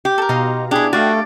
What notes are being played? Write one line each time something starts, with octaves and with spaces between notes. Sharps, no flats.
G4
A4 A#4
B2 D#4 D#5 F5 A#5 C6
D4 E4 G4 G#4
A3 F#4 G4 D5 F5 G5